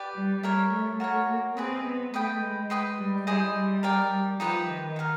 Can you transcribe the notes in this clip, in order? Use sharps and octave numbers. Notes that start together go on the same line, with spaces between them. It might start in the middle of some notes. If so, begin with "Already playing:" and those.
Already playing: G4 B4 D5
G3
G3 A#4 C#5 E5
A3
F#4 A#4 C#5
A#3
C4 G#4 B4 D#5
B3
A3 B4 D#5 G5 B5
G#3
B4 D#5 G5 C6
G3
G3 E4 G#4 C5 D#5
G3
A#4 D5 G5
G3
F3 D#4 G4 B4 E5
D#3
D#4 G4 A#4